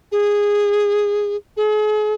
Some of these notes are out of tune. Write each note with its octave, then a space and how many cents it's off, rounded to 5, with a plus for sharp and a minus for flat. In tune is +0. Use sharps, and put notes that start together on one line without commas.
G#4 -15
G#4 +40